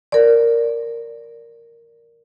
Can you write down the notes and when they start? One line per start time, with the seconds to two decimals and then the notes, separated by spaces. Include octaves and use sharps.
0.12 A#4 D5